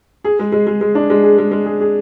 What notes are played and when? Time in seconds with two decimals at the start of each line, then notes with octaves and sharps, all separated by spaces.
0.24 G#4
0.39 G#3
0.52 G#3
0.67 G#3
0.81 G#3
0.95 D4
1.10 G#3
1.23 G#4
1.38 G#3
1.52 G#3
1.66 G#4
1.81 G#4